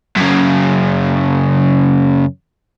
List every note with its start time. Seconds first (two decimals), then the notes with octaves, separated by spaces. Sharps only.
0.16 F#2 C#3